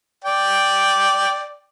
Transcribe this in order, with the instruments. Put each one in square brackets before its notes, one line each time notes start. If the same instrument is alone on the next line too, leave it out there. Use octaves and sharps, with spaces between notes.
[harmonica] D5 G5